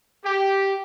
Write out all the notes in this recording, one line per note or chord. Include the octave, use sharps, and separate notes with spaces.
G4